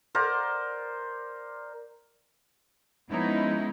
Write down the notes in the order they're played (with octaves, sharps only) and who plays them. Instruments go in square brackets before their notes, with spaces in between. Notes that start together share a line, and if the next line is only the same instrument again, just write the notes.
[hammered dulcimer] A#4 C5 D5 F#5
[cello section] F3 G#3 B3 C#4 D#4 E4